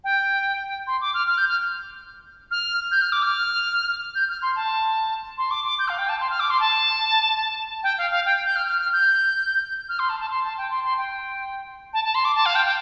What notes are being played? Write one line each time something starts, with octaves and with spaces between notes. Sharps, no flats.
G5
C6
D6
F6
F6
G6
F6
F6
G6
F6
D6
F6
G6
F6
C6
A5
C6
D6
D6
G6
F5
G5
A5
C6
F6
D6
C6
A5
G5
F5
F5
G5
G6
F6
F6
F6
G6
F6
C6
A5
A5
C6
A5
G5
C6
C6
G5
A5
A5
C6
D6
A5
F5
G5
G5